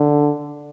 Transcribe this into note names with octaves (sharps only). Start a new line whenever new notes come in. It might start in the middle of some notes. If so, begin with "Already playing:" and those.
Already playing: D3